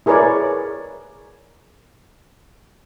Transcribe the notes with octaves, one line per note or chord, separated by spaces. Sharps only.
E4 G#4 A#4 B4 C#5 D5